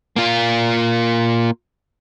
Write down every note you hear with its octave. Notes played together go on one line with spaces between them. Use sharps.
A#3 F4